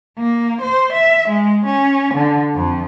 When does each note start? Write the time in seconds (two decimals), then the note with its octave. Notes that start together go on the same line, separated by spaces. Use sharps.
0.18 A#3
0.62 C5
0.93 E5
1.29 G#3
1.66 C#4
2.14 D3
2.54 F2